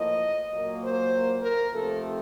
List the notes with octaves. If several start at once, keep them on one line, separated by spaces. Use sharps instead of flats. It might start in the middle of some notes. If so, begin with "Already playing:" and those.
Already playing: A2 F3 A#3 D#5
A#2 F#3 A#3
C5
A#4
C3 F3 A3 C4 A4